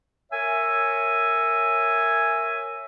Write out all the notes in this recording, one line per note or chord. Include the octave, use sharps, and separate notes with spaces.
A#4 C#5 E5 G#5